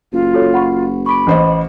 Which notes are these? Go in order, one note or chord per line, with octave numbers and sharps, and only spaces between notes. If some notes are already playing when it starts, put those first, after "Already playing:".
F#1 F4
F#4 A4 C#5
F#5 B5 C#6
B5 C#6 D6 D7
A1 C5 D#5